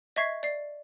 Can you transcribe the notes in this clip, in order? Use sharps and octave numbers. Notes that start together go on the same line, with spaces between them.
D#5 E5 C#6 G#6 C7
D5 C7